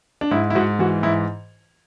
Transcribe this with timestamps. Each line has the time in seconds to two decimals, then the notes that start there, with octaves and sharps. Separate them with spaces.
0.21 D4
0.31 G#2 E4
0.50 E4
0.55 G#2 F#4
0.79 E3 F#4
1.03 G#2 E4